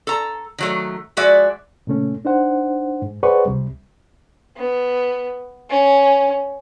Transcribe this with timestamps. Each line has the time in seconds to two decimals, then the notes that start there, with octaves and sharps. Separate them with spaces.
0.07 A4 A#5
0.58 D#3 F#3 A3
1.17 F3 G#3 F#4 D5 E5
1.87 A#2 C#3 A3 C#4
2.25 D4 D#4 C5 F#5
3.02 G#2
3.23 G#4 B4 C5 D5 F#5 C#6
3.46 C#2 C3 G3
4.57 B3
5.70 C#4